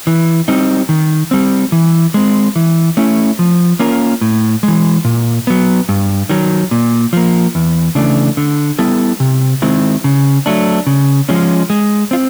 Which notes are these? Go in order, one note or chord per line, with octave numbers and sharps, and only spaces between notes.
E3
G3 C4 D#4
D#3
G3 C4
E3
G#3 C4
E3
A3 C#4 E4
F3
A#3 C#4 F4 A#4
A2
G#3
E3
A#2
F#3 B3
G2
D#3 F#3
A#2
F3 A#3
E2
C#3 E3 A3 D4
D3
G3 B3 E4 A4
C3
D#3 G#3 C4 E4
C#3
F#3 A3 D4
C#3
F3 G#3 C#4
G#3
C4 F4